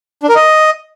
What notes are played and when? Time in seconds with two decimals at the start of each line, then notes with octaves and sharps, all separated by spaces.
0.23 D4
0.29 A#4
0.35 D#5